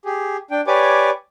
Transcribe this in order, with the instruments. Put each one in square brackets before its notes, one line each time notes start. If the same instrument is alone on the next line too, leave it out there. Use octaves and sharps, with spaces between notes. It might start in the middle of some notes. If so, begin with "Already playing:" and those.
[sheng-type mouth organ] G4 G#4
D4 G5
G4 B4 C#5 D5 G#5 D6